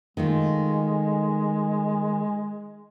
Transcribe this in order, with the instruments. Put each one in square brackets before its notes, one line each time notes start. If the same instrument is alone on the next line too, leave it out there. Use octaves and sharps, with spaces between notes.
[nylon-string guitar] D#3 A3 F4 [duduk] G#3